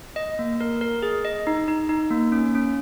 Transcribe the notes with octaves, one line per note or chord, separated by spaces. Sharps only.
D#5
A#3
A#4
A#4
G#4
D#5
D#4
D#4
D#4
A#3
C#4
C#4